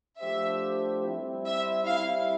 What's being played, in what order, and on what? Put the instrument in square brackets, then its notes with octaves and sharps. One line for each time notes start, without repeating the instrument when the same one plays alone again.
[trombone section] F3 A3 D4 G4 C5 [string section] E5
[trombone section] G3 C4 E4
[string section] E5
[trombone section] G3 C4 E4 [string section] F5